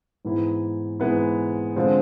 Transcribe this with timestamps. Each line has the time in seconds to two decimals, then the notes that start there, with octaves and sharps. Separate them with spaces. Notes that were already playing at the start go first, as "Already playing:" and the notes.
0.25 G#2 E3 G#3 B3 E4
1.00 G#2 E3 G#3 B3 E4
1.76 D3 F3 G#3 C4